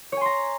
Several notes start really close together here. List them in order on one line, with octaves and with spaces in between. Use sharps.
C#5 G#5 C6 A#5